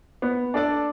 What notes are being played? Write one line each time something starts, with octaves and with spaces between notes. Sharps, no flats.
B3
D4 A4 D5